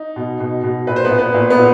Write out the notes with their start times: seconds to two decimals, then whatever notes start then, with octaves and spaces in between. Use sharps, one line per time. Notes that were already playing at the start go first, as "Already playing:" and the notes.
Already playing: D#4
0.16 B2
0.40 B2
0.63 B2
0.87 A#2 B4
0.96 C5
1.05 B3 B4
1.11 A#2
1.18 B3 B4
1.34 A#2
1.50 B3 B4
1.58 A#2